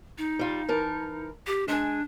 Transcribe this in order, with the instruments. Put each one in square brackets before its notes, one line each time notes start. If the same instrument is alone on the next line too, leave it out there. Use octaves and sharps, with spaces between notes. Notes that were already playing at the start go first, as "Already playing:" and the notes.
[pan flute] D#4
[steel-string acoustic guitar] G3 F4
E3 A#4 A5
[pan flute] G4
[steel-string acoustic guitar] G#3 G#5 [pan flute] D4